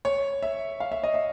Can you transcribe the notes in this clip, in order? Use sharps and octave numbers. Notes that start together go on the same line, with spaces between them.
C#5
E5
F5
E5
D#5
E5